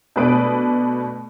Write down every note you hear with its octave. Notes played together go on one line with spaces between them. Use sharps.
B2 A3 D4 B4 D#6 D7